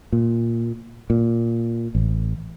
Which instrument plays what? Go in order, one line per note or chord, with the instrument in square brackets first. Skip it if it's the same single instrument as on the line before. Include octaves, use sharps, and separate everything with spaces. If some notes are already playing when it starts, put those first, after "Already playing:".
[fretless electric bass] A#2
A#2
A1